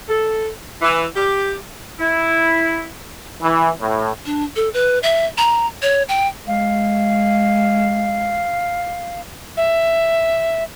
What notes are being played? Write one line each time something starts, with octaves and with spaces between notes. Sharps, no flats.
A4
E3
G4
E4
E3
A2
D4
A4
B4
E5
A#5
C#5
G5
G#3 F5
E5